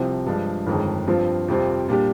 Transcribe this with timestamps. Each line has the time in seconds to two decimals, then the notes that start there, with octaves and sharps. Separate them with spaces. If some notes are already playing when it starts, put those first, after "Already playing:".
Already playing: C2 C3 F3 C4
0.26 G2 F3 G#3 D4
0.67 G1 F2 D#3 G#3
1.07 G2 F3 C4 F4
1.48 F2 C3 G3 C4 F4
1.88 A#2 G3 D4 G4